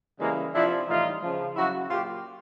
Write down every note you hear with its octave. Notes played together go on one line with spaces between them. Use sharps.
C#3 E3 G3 G#3 A#3
C3 F3 D4 E4
A2 E3 G3 D#4 F4
C#3 F3
C#3 F#3 E4 F#4
A#2 F#3 F4 G4